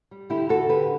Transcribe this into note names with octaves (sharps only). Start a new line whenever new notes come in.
G3
D3 E4 G4
D2 F#4 A4
D3 G4 B4